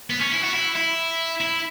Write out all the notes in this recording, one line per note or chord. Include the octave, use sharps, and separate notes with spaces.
B3
C#4
E4
F#4
E4
E4
E4